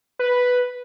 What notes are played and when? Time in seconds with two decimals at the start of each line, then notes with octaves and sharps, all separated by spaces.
0.19 B4